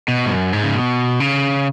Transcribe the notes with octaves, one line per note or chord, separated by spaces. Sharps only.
B2
G#2
F#2
G#2
C#3
B2
C#3